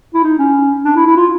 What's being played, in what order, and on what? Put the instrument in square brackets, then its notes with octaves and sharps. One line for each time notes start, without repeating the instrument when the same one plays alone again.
[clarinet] E4
D#4
C#4
D4
E4
E4
F4